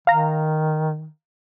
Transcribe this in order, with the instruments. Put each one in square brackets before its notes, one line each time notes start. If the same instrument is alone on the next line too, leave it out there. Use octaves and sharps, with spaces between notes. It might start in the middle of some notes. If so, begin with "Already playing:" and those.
[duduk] D#3 [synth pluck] F5 A#5